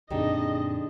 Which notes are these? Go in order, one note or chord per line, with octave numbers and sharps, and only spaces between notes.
F#2 A#2 D3 C4 D#4 G4 G#4 D#5